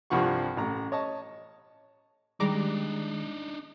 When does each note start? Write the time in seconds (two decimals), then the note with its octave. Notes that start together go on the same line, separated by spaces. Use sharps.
0.10 C2 G2 F3 F#5 C#6
0.57 A1 A#5
0.92 C#5 D#5 A5
2.40 D#3 G3 G#3 D4 D#4 A#5 D6